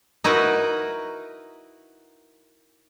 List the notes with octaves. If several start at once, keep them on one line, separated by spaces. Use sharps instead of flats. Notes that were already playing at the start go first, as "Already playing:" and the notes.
D#4 E4 F#4 A#4 B4